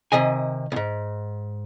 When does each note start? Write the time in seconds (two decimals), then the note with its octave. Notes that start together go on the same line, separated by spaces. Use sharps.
0.12 C3 D#3 D#5 G#5
0.72 C2 G#2